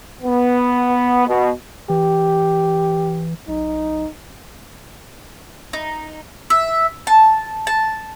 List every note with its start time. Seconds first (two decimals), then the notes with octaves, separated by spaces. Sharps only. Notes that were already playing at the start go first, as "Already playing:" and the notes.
0.23 B3
1.27 B2
1.90 E3 G4
3.48 B1 D#4
5.73 D#4
6.50 E5
7.07 A5
7.67 A5